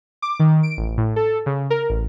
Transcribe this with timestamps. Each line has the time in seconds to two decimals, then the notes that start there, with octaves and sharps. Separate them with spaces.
0.22 D6
0.40 D#3
0.63 D7
0.78 A1
0.98 A2
1.16 A4
1.46 C#3
1.70 A#4
1.90 A1